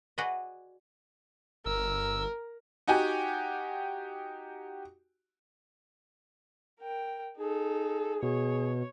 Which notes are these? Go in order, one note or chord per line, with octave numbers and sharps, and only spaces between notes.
F#4 G#4 B4 D5 D#5
G1 A#4 E6
D#4 F#4 G4 G#5
A#4 G5
D#4 G#4 A4
B2 G#4 C#5